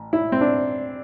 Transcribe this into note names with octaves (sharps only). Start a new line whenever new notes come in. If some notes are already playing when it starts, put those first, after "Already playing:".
Already playing: A1
E4
C4
D4